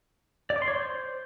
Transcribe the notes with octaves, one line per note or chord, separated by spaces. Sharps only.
D5
D6
C6
C#5
C5